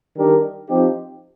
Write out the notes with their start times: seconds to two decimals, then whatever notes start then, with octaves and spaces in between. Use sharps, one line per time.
0.16 D#3 G3 D4 G4 A#4
0.68 F3 C4 D#4 G4